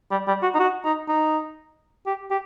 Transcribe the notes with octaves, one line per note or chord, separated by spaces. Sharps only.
G3
G3
F#4
D#4
F#4
D#4
D#4
G4
G4